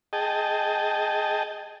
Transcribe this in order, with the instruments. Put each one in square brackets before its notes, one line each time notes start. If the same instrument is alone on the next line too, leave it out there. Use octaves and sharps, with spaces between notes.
[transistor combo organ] G#4 D#5 G5 A5